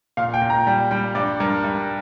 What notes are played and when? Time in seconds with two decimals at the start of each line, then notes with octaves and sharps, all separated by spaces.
0.17 A#2 F5
0.34 G5
0.42 A#2
0.50 A#5
0.67 G3 G5
0.91 G3 G5
1.15 G2 D5
1.40 G2 A#4
1.64 G2